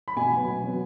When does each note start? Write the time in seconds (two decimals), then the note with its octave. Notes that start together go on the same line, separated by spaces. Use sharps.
0.08 B5
0.17 B2 G#5
0.33 F#3 B3
0.48 B2
0.64 F#3 B3